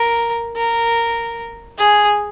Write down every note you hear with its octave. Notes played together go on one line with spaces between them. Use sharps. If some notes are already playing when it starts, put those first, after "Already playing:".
Already playing: A#4
A#4
G#4